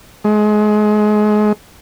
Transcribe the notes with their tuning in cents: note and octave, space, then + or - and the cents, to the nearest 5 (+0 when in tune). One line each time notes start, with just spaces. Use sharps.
G#3 +25